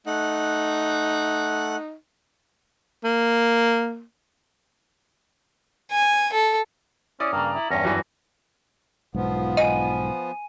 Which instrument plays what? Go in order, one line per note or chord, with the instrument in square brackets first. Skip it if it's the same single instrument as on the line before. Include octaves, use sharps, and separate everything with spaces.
[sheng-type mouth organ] A3 F#5 F#6 [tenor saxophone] D#4
[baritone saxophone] A#3
[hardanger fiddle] G#5
A4
[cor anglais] C#4 [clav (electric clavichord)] E4 [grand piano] D5 D#6
[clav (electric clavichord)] G2 C#3 [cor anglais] A#3 [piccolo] A#5
[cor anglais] E4
[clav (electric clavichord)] E2 G2 [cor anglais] C#4 [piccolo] A#6
[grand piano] F#2 E3
[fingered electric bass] B1 G#2 [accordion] F3 B3
[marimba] D#5 [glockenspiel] G#5 D#7